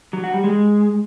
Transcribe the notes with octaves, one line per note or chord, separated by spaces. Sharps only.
F#3
F#4
G3
G#3